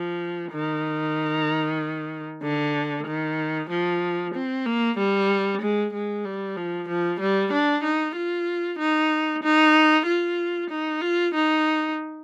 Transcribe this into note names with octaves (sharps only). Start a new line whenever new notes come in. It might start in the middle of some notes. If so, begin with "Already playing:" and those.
Already playing: F3
D#3
D3
D#3
F3
C4
A#3
G3
G#3
G#3
G3
F3
F3
G3
D4
D#4
F4
D#4
D#4
F4
D#4
F4
D#4